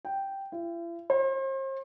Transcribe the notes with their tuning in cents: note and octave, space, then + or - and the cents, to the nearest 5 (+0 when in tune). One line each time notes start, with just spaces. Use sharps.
G5 -5
E4 +45
C5 +40